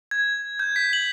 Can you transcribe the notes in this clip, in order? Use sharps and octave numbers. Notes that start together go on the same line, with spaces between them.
G#6
G6
B6
F#7